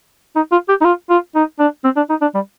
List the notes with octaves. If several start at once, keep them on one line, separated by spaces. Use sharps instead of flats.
D#4
F4
G4
D#4
F4
F4
D#4
D4
C4
D4
D#4
D4
G3